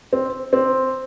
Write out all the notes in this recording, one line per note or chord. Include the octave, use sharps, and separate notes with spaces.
C4
C4